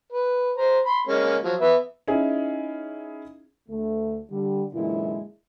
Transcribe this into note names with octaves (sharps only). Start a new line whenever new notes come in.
B4
C5 A#5
B5 C6
G#3 A#3 C#4
F3 F#3
B3 B4 E5
C#4 D#4 E4 G#4
D2 A3
D3 G3
F#2 A#2 D3 E3 G#3 E4